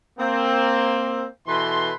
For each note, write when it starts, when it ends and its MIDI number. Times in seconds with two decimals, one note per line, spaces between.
0.19 1.26 58
0.19 1.26 60
1.47 1.93 47
1.47 1.93 52
1.47 1.93 69
1.47 1.93 71
1.47 1.93 84